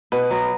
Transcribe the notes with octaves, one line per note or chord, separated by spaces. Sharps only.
B2 B4
F#3 B3